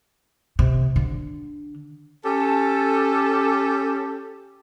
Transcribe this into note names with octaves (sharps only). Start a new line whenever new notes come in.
C3
D3
C#4 G4 A4